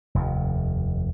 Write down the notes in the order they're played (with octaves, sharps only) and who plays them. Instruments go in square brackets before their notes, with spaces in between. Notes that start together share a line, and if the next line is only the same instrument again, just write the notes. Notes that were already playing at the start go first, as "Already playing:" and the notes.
[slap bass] F1 D#2